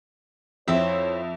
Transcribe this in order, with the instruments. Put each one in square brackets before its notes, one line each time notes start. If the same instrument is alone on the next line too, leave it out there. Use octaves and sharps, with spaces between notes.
[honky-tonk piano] F2 E5 [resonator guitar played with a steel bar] C4 E4 [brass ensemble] C#5